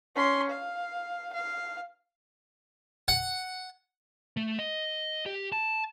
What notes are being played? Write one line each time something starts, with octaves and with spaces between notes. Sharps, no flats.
C#4 C6
F5
F5
F#5
A3
D#5
G4
A5